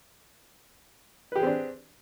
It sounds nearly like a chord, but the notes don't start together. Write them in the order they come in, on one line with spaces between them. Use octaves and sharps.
B4 G4 G#4 C4 D4